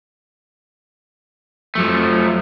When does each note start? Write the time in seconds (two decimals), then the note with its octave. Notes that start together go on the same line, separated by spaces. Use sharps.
1.75 F2 F3 F#3 A3